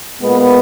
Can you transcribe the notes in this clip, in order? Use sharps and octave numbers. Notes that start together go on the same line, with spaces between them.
A#2 G#3 B3